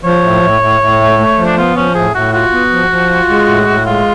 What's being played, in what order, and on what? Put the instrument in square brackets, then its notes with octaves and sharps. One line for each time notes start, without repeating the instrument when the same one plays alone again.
[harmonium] F3 [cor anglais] C#5
[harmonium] A2
A2
A2
A2
A3
A3
F3
[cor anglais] D4
[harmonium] B3 [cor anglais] F4
[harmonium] F3 [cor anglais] C#4
[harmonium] A2 [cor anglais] G#4
[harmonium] A2 [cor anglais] F#4
[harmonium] F4 [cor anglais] F#4
[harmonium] B3
F3
F3
F4
G#3
A2
A2
[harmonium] G#3 [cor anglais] F4